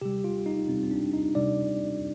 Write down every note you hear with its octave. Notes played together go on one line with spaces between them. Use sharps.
C3 G3 G4
F4
D#4
C3 G3 C4
C4
D4
D#4
C3 G3 D5